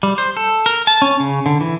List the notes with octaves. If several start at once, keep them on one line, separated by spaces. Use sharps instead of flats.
G3
C5
A4
A#4
A5
C#4
C#3
D3
E3